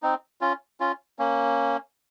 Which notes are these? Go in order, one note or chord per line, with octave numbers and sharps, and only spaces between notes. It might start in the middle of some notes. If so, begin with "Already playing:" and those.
C4 D#4
C#4 F4
C#4 F4
A#3 C#4